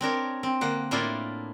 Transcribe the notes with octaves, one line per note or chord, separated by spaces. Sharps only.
C4 D4 A#4 C#5
C4
D3 A#3 F#5
A2 A#3 D4 E4 F4 A4